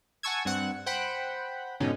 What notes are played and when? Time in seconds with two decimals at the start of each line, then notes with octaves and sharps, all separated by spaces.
0.23 F#5 G#5 A5 C#6 E6 G#6
0.45 G2 C4 F#5
0.86 C5 F#5 G5 B5
1.80 G#2 B2 D3 C#4 D#4